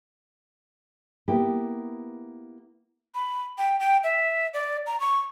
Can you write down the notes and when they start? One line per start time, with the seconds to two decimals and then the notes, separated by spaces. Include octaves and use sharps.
1.28 A#3 B3 E4 G4
3.15 B5
3.58 G5
3.80 G5
4.04 E5
4.54 D5
4.87 A#5
5.00 C#6